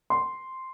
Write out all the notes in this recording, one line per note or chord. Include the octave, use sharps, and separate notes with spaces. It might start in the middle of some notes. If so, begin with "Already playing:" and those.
C6